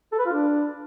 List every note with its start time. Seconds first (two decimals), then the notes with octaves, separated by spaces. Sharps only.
0.12 A4
0.19 B4
0.26 F4
0.33 D4